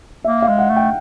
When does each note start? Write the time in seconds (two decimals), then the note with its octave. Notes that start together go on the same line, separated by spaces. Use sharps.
0.24 A#3 E5
0.42 F5
0.48 G#3
0.58 F#5
0.70 A3
0.76 G5